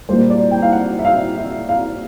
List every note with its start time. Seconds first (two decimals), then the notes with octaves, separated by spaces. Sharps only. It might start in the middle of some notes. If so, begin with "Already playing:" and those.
0.09 A#2 G3 A#3 C5
0.30 D5
0.51 G5
0.62 F5
0.72 F#5
0.99 E5
1.05 F5
1.37 E5
1.69 F5